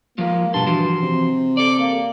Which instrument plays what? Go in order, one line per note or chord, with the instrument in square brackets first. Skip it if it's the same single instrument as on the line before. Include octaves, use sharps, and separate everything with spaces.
[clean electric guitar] F3 G#3 F4 [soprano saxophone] A#3
[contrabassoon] G2 [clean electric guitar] B2 C6 [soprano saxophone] A5
[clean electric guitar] E3 F3 F#4 [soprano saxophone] C6
[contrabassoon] C3
[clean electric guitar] A4 D5 [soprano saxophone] D6
[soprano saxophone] A#3